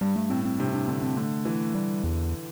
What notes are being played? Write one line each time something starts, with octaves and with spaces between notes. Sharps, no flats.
G2 G3
A3
A2 C4
C4
C3 D4
D4
D3 C4
C4
D3 A3
E3
G3
E2